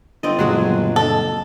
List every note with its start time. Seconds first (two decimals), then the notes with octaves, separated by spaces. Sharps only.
0.23 G1 C4 D5 D#5
0.39 F#1 A#2 F#3 G#3 F#4
0.96 A4